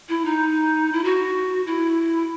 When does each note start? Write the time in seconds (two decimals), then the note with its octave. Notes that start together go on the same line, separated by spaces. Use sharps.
0.09 E4
0.25 D#4
0.93 E4
1.04 F#4
1.67 E4